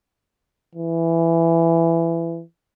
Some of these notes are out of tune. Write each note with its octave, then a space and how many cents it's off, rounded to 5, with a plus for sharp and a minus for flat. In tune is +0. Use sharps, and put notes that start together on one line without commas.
E3 +15